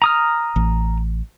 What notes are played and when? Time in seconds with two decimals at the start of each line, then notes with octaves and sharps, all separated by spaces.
0.02 A#5 D#6 F6
0.56 A1